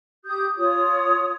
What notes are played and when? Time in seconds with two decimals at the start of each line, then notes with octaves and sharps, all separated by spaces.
0.25 G4 D#6 G6
0.57 F4 C#5 D#6